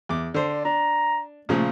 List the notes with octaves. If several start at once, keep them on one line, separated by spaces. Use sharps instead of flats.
E2 D6
D3 C5 D5
D4 A#5
A#2 C#3 F3 A3